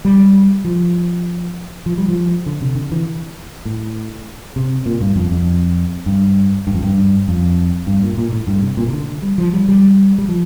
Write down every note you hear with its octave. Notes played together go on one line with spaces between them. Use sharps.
G3
F3
F3
G3
F3
D3
C3
D3
E3
A2
C3
A#2
G2
F2
F2
G2
G2
F2
G2
F2
G2
A#2
A#2
A2
G2
C3
A#2
C3
D3
G3
F3
G3
G3
G3
F3